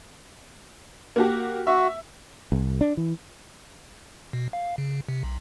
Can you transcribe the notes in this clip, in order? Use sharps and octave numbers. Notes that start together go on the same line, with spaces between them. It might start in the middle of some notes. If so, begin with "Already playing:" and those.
A#3 F#4 G4
F#4 E5
C2
D4
E3
B2
F5
C#3
C3
B1